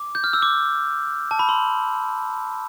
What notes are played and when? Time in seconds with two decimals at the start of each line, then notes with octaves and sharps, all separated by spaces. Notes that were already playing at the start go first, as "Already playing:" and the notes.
Already playing: D6
0.15 G6
0.24 F6
0.33 E6
0.42 D6
1.31 A5
1.39 B5
1.49 C6